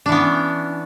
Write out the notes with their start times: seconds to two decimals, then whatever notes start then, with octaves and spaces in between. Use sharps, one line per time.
0.06 D4
0.09 E3
0.12 B3
0.15 C#4